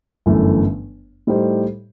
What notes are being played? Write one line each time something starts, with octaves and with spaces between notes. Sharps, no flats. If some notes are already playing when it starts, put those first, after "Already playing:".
G1 F#2 E3 A3
A2 G3 D#4 G4 C5